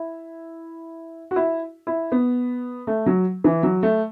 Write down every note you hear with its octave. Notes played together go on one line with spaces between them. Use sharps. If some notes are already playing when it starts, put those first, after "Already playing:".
Already playing: E4
F#4
E4
E4
B3
A3
F#3
E3
F#3
A3